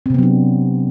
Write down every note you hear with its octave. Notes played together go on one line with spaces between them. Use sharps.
C3 F#3 B3 C4 D4